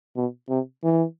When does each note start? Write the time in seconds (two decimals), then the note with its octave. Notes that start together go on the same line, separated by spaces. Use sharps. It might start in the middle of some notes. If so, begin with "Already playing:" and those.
0.16 B2
0.49 C3
0.84 E3